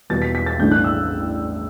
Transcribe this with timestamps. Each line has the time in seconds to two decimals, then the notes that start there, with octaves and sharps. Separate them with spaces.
0.10 E1 E2 B2 G3 B3 A6
0.22 B6
0.35 B6
0.46 A6
0.59 A1 G2 E3 A3 D4 G6
0.71 F#6
0.84 E6